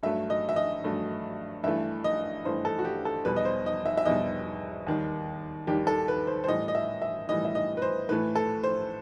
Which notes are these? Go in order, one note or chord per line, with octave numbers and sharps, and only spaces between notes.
G2 F#3 A3 E5
D#5
E5
D#5
G2 F#3 A3
G2 E3 A3 E5
D#5
G2 E3 A3 C5
A4
F#4
G4
A4
E2 B2 G3 B4
D#5
C5
D#5
E5
E5
E2 B2 G3 D#5
D#2 D#3 G3
D#2 D#3 G3 G4
A4
B4
C5
C5
A2 E3 G3 D#5
D#5
E5
E5
A2 E3 G3 D#5
E5
D#5
B4
C5
A2 E3 A3 B4
A4
C5